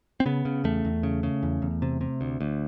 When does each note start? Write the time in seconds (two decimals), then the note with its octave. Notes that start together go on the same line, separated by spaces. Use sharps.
0.20 C4
0.26 C#3 B3
0.45 C#3
0.64 E2 A3
0.85 E2
1.03 C#3
1.23 C#3
1.43 E2
1.62 E2
1.82 C3
2.01 C3
2.21 D2
2.41 D2